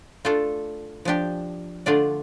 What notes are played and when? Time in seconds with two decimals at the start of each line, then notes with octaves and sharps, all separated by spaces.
0.25 A3 D4 F4 A4
1.05 F3 D4 G4
1.86 D3 A3 D4 F4 D5